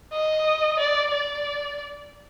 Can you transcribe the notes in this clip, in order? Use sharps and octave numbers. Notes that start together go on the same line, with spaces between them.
D#5
D5
D5